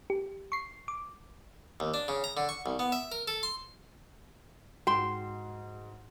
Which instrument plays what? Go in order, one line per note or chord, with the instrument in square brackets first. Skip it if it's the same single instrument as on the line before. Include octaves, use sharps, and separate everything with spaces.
[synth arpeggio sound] G4
C#6 C7
D6
[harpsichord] D#2
D4
C#3
A#5
D3
C#6
C2
B3
E5
A#4
A4
C6
[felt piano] G#2 [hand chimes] F#4 [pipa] G5 C6